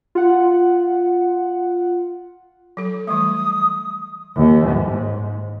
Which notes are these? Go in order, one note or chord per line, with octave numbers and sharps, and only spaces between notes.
F4 F#5
F#3 A4
E3 G3 A3 D#6
D#2
G#2